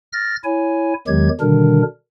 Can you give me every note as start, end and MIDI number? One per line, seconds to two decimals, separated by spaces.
0.13 0.36 89
0.13 0.36 93
0.13 0.36 94
0.44 0.94 64
0.44 0.94 73
0.44 0.94 80
1.08 1.29 40
1.08 1.29 51
1.08 1.29 54
1.08 1.29 56
1.08 1.29 67
1.08 1.29 92
1.41 1.82 47
1.41 1.82 50
1.41 1.82 51
1.41 1.82 55
1.41 1.82 62
1.41 1.82 70